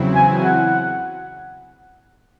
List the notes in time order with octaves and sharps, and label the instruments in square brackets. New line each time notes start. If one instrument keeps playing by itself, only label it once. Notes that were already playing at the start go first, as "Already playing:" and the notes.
Already playing: [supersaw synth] E2 C#3 F#3 C4 E4
[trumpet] G#5
F#5